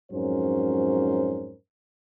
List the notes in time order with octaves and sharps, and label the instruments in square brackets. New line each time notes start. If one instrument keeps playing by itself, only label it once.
[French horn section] F2 G#2 F#3 C#4 A#4 C5